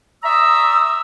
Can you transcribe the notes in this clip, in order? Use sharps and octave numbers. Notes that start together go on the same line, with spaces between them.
D5 E5 A#5 C#6 D#6 E6